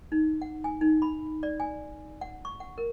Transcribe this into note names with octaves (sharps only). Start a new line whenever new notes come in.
D#4
F#5
G#5
D#4
B5
D5
G#5
F#5
C#6
F#5
A#4